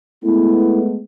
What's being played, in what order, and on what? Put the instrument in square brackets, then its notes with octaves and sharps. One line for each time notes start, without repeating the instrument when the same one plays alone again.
[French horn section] G#3 A3 B3 [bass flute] E4